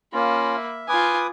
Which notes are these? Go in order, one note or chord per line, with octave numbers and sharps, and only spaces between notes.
A#3 C#4 F4 B5
E5
F4 B4 G#5 D6 D#6